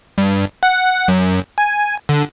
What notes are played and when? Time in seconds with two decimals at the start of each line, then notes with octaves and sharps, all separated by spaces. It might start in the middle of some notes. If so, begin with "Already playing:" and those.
0.18 G2
0.63 F#5
1.08 F#2
1.58 G#5
2.09 D3